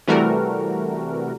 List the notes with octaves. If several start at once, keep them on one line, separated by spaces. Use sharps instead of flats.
C3 E3 G3 A3 F#4 A#4